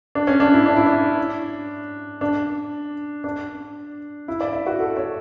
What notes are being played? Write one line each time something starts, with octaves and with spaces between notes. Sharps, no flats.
D4
C#4
D4
E4
D4
E4
D4
D4
D4
E4
D5
E5
F#4
A4
C#5